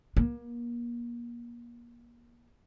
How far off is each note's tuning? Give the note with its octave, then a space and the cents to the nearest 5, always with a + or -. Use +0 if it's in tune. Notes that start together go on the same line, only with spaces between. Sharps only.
A#3 +35